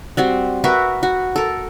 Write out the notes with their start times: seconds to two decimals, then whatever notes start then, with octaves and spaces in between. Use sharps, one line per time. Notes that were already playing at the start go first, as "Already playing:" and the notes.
0.17 G3 C4 F#4
0.64 F#4 A#4 B4 E5
1.03 F#4
1.36 A4 A#4